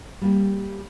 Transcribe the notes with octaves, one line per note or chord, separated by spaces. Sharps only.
G3 A#3 G4